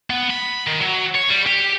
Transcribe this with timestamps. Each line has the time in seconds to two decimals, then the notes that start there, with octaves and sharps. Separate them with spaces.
0.10 B3
0.31 B5
0.68 D#3
0.82 F#3
1.15 C#5
1.30 G3
1.47 G4